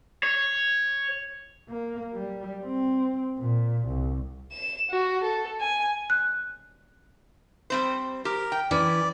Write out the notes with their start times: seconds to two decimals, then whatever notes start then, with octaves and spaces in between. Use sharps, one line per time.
0.23 C#5
1.69 A#3
2.14 G3
2.66 C4
3.38 A#2
3.88 C2
4.52 E7
4.90 F#4
5.23 A4
5.60 G#5
6.10 F#6
7.70 G3 C4 C5
8.25 G4 A#4
8.52 G5
8.71 E3 C#4 D5